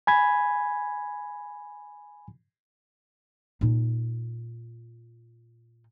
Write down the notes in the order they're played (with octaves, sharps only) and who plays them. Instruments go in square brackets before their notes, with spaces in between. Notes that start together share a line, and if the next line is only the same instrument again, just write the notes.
[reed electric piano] G#5 B5 G#6
[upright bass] A#2 D#4